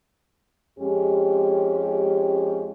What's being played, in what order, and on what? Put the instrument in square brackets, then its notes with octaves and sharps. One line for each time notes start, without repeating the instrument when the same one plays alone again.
[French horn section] F2 G#3 C#4 G4